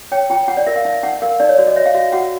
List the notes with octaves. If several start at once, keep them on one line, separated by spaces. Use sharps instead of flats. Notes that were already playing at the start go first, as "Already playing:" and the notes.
C#5 G5
F4 G5
F4 F#5
D5
A#4 E5
F5
D#4 E5
D#4 F#5
A#4 F5
D#4 D5
C#5
F#4 D5
D#5
C#5 E5
F5
F#4 E5
F#4 F#5